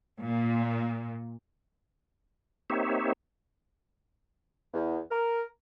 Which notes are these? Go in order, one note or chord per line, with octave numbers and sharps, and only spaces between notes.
A#2
A#3 C4 D#4 G4 C#5 E5
E2
A#4